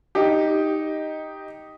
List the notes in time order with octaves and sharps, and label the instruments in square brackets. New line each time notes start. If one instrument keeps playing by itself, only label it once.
[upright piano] D#4 G4